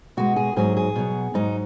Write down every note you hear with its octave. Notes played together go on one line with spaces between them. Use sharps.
B2 G#3 F#4
G#4
G#2 F#3 G#4
G#4
B2 F#3
G#2 F#3 D#4